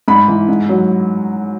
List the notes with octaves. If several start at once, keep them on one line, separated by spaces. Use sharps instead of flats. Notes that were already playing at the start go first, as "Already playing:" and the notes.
G#2 B5
E3
G#2
F#3